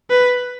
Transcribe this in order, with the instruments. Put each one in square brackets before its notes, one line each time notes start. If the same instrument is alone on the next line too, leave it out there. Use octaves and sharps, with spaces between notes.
[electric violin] B4